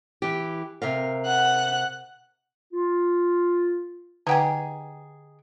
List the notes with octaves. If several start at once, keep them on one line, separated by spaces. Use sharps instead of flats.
E3 G4
C3 A#4 F5
F#5 F#6
F4
D3 D#4 G4 G#4 B4 F#5